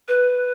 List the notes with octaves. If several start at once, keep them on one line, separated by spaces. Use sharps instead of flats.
B4